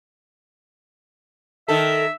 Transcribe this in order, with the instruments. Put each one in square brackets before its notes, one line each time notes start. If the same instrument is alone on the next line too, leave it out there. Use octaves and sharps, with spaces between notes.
[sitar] D#3 A4 [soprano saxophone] E5